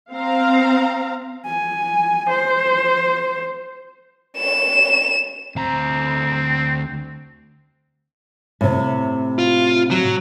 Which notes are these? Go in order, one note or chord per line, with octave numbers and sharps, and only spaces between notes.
C4 F5 A#5
G#5
C5
E7
D2 C4 A#5
A2 C3
F4
F#3